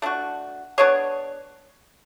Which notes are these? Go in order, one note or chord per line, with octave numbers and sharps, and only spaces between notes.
A3 D4 F#4
B3 D4 G#4 C#5